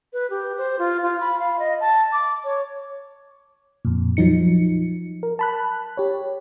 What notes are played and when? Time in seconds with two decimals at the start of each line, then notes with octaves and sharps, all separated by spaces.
0.13 B4
0.30 G4
0.58 C5
0.79 F4
1.03 F4
1.21 B5
1.39 F5
1.59 D#5
1.81 A5
2.13 D6
2.44 C#5
3.85 F2 A#2
4.17 F3 F#3 D#4 C#7
5.23 A#4
5.39 A5 B5 F#6
5.97 G4 C#5